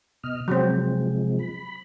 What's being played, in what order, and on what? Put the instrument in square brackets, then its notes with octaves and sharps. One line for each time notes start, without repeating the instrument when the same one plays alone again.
[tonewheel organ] B2 D#5 F6
[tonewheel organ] C3 F3 G#3 [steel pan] F#3 C4
[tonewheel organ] B5